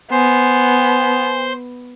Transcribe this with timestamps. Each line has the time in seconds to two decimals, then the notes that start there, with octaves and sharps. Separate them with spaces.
0.11 B3 C5 G#5